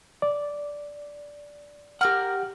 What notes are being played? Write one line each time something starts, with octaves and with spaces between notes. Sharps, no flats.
D5
G4 A#4 F#5 F6